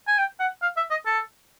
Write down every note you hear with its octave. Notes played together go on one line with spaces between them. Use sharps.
G#5
G5
F#5
F5
E5
D#5
A4